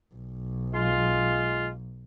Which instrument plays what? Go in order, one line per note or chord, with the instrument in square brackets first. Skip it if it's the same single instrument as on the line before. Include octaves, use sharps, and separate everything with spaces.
[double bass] B1
[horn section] G#3 F4